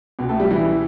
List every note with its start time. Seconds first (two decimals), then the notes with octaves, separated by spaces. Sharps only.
0.19 C#2 B2
0.29 A3 A4
0.40 G3 G4
0.50 E3 E4